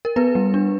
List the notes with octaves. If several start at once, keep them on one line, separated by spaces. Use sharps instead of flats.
A#4
B3 B4
G3
D4